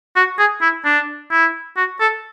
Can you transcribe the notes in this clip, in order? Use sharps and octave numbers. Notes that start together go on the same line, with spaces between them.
F#4
G#4
E4
D4
E4
F#4
A4